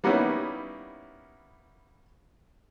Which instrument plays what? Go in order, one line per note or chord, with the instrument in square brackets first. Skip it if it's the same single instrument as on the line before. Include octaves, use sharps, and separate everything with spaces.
[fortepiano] G3 A#3 B3 C#4 D#4 E4